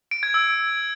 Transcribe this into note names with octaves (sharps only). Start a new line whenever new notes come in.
D7
G#6
E6